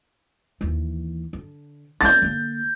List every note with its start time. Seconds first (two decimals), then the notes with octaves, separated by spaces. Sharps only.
0.61 D#2 E3
1.33 D3
2.01 A#3 C#4 G6 A6
2.22 D3 A#3